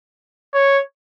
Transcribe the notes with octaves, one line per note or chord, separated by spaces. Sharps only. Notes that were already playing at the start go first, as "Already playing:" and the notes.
C#5